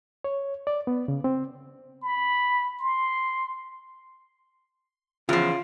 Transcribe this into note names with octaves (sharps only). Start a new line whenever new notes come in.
C#5
D5
B3
C#3
C4
B5
C6
E2 C#3 F3 F4